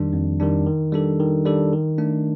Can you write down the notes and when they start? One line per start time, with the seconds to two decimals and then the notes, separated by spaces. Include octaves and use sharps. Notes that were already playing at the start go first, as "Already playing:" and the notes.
Already playing: F2 D#3 G3 D4
0.13 F2
0.40 D#3 G3 D4
0.66 D#3
0.92 G3 D4 A4
1.20 D#3
1.46 G3 D4 A4
1.73 D#3
1.98 A3 D4